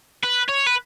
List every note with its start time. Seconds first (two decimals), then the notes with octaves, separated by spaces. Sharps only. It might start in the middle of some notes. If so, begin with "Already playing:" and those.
0.23 B4
0.49 C#5
0.66 B4